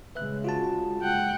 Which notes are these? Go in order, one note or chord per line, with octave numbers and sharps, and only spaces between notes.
C#3 G#3 B4 E5 F#6
F4 F#4 A5
F#1 G#3 F#5 G5